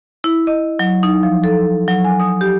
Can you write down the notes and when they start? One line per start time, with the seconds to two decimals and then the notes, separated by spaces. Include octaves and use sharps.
0.24 E4
0.47 D#5
0.79 F#3
1.03 D#4
1.23 F3
1.44 A4
1.88 F#3
2.04 G#5
2.20 D#6
2.41 G4